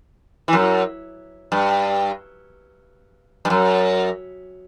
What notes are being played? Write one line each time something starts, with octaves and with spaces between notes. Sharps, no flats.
E3
F#2
G2
G2
F#2